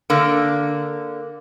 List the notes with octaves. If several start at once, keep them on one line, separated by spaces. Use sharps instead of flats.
D3 A#3